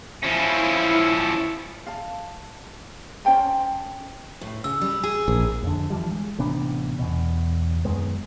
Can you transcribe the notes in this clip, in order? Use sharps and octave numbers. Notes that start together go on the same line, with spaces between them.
F3 C#4 E4
F5 A5
C#4 C5 G5 A5
A2
C#3 E6
G3
G#4
A#1
F2 D3
E3 F3 G3
G#3
A1 C3 B3 D4
E2 B2
F#2 D#3 G#3 B3